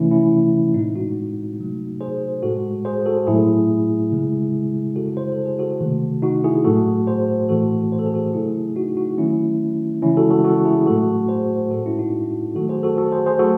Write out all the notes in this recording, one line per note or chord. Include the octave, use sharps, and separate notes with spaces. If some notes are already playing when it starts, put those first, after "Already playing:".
Already playing: C3 E3 A3 C#4 E4
C#4 E4
A2 G#3 C4 D#4
D#4 F#4
C3 F#3 A3
G#4 C5
A2 G#3 F#4 A4
G#4 C5
F#4 A4
A2 F#3 A3 E4 G#4
C#3 G#3
C#3 G#3 F#4 A4
C5
A4
G#4
F#4 A4
C3 D#3 A3
D#4 F#4
E4 G#4
A2 F#3 A3 F#4 A4
G#4 C5
A2 E3 A3 F#4 A4
C5
A4
G#4
F#4 A4
C#3 F#3 A3 E4 G#4
D#4 F#4
D#4 F#4
D#3 F#3 A3 C#4 E4
C#3 E3 G#3 C#4 E4
F#4 A4
F#4 A4
F#4 A4
E4 G#4
A2 F#3 A3 F#4 A4
G#4 C5
A2 G#3 F#4 A4
C#4 E4
D#4 F#4
D#3 F#3 A3 F#4 A4
G#4 C5
F#4 A4
F#4 A4
G#4 C5
G#4 C5
F#3 A3 F#4 A4